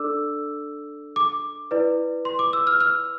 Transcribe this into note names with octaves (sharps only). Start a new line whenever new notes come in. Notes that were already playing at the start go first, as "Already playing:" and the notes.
Already playing: D4 A4 D5 D6 E6
D6
E4 B4 D5
C6
D6
E6
F6
F6